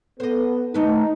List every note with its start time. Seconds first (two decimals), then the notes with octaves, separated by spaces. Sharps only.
0.20 B3 A4 C5 D#5
0.74 D#3 A3 D#4 B4